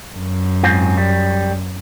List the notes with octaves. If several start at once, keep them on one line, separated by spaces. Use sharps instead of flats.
F#2
G#2 C4 F4
G3